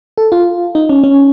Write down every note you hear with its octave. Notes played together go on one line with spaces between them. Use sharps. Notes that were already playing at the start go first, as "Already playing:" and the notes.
A4
F4
D#4
C#4
C#4